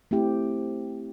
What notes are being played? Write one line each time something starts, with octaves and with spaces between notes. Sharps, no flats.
A3 C4 E4 G4